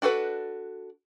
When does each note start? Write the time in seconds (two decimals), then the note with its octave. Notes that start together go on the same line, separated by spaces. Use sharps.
0.02 D4 F#4 A4 B4